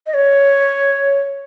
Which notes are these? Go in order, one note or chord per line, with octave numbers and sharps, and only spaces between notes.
D#5
C#5